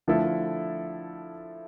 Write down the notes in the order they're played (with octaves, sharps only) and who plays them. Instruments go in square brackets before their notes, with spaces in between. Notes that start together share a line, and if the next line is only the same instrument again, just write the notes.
[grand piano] D3 F3 A3 E4 A4